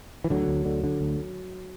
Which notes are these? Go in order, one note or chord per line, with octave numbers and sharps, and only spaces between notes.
E3
D2 D3 F#3
D2
D3
D3
D2